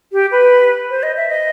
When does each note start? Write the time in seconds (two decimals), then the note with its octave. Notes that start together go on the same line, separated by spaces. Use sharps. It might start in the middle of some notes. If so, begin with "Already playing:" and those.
0.12 G4
0.31 B4
0.90 C5
1.03 D#5
1.17 E5
1.29 D#5